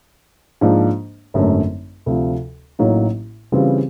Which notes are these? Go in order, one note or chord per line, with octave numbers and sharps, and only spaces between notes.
G#2 F3 A#3 D4
G#1 F#2 D3 F#3 A3
D2 C3 F3
A1 A2 F#3 A#3 D#4
C#3 E3 G3 C4 F4